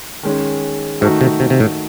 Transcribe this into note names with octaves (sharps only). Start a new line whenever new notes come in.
D#3 G#3 C#4
G#2 D#3 A3 D#4 F#4
C3
C3
C3
A2